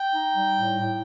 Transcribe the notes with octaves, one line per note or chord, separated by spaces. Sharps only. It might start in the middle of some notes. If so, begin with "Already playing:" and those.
Already playing: G5
D#4
G3
A2
A2